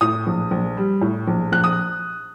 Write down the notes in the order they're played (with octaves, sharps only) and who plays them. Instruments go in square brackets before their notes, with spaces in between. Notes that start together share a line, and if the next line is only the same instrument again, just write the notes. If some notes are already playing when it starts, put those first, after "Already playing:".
[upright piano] A2 D#6
A#1
A#1
G3
A2
A#1
A#1 F#6
D#6